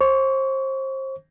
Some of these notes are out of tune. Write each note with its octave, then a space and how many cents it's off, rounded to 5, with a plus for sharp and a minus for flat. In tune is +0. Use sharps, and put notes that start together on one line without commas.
C5 +30 C#6 +35